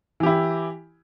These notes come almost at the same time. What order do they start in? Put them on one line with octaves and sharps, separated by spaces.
E3 G4 E4